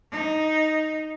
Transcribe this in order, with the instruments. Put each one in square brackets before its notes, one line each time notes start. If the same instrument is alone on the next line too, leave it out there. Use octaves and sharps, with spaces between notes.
[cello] D#4